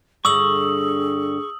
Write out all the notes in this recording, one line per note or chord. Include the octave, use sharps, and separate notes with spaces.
G2 D3 F4 G#4 C#6 D#6 E6 F#7